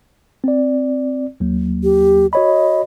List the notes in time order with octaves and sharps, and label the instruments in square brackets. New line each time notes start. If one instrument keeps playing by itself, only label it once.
[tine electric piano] C4 D5
D#2 F#3 A#3
[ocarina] G4
[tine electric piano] F#4 C#5 B5 [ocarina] D#5